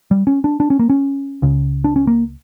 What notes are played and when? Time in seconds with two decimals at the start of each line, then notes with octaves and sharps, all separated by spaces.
0.11 G3
0.27 C#4
0.44 D4
0.60 D4
0.70 C#4
0.79 A#3
0.90 C#4
1.42 C#2 C#3
1.84 D4
1.96 C#4
2.07 A#3